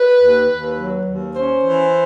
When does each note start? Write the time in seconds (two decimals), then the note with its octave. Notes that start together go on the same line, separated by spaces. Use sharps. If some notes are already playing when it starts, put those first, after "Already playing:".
Already playing: B4
0.19 D#2
0.49 D#2
0.76 F#3
1.06 D#2
1.34 C#4 C5
1.64 E3